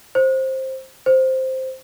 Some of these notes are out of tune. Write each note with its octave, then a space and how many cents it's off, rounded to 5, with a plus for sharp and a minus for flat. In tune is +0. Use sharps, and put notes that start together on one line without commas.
C5 +15
C5 +0